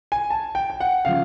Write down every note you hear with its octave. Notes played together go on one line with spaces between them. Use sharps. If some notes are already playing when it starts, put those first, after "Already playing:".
G#5
A5
G5
G5
F#5
C#3 F3 F5